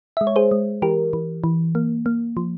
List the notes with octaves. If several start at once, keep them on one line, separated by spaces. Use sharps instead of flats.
G#3 E5
C#5
G#4 C5
G#3
E3 G4 A#4
E3
E3
A#3
A#3
F3